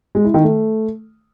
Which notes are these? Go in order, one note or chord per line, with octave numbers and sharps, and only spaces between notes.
G#3
E4
D#3
A3